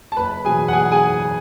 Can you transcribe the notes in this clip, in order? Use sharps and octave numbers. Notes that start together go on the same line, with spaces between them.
A5
F#1 B4 B5
E2 B2 F#3 G#4 G#5
F#5
F#1 G#4 G#5
G#4 G#5